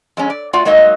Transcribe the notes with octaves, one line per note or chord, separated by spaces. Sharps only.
F2 G#3 C#4
D5
A3 F4 F#4 D5 F#5
F#3 G#3 A#3 D#4 F#4 D#5